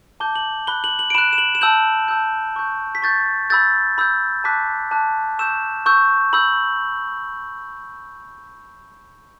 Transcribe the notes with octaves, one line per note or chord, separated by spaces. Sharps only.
A5 D6 G6 G7
F#7
B5 F#6 G7
F#7
F#7
D7
B5 F#6 E7
E7
F#7
E7
A5 E6 G6 F#7
A5 E6 G6
C#6 G6
B6
C#6 G6 A6
B5 E6 G6 A6
B5 E6 G6
A5 D6 F#6 B6
A5 D6 F#6
C#6 E6 G6 E7
C#6 E6 G6
B5 E6 G6 F#7